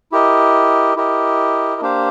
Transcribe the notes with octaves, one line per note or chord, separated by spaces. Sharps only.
E4 G4 A#4 D#5
E4 G4 A#4 D#5
A#3 D4 G4 C5 F5